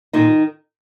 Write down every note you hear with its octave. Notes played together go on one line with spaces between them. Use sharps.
A#2 D#3 D#4